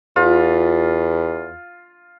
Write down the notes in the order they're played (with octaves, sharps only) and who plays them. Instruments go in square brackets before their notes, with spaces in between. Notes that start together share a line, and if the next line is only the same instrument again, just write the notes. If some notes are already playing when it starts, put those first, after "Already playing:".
[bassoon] E2 [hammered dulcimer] F4